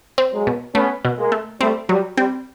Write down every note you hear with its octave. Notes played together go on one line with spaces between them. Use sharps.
C4
F#3 G#3
B2
A3 B3 C#4
B2
G#3 A#3
A3
G3 A3 C4
F#3 G3
G3 C4